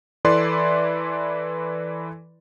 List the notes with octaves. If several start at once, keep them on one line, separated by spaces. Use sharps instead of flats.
E3 E4 A4 B4 D5 C6